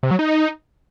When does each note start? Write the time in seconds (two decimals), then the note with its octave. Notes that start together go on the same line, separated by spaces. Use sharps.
0.03 C3
0.11 F#3
0.19 D#4